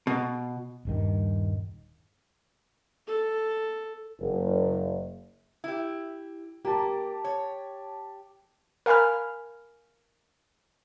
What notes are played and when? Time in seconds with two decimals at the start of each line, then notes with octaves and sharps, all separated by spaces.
0.07 B2
0.85 D#1 G2 D#3
3.07 A4
4.20 F#1
5.64 E4 G4
6.65 A#3 G4 A5
7.24 C#5
8.86 A#4 F5 G#5 B5 F6